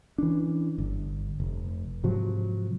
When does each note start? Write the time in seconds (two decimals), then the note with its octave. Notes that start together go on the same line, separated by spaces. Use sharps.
0.18 E3 C#4 D4
0.78 G1
1.40 F1
2.03 G#2 C3 F3 F#3